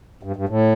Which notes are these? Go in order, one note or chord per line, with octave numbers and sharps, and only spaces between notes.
G2
G2
A2